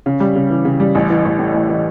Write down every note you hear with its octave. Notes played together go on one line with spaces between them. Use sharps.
C#3
G3
C#3
E3
C#3
G3
A1
E3
A1
A2
A1
E3